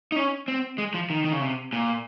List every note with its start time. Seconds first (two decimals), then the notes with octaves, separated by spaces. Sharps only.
0.12 D#4
0.16 C#4
0.48 C4
0.78 G#3
0.94 F3
1.10 D#3
1.24 D#3
1.33 C#3
1.41 C3
1.73 A#2